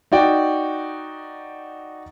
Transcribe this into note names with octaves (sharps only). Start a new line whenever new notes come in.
D#4 F#4 D5 G5